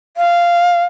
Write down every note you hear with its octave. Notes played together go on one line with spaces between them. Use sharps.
F5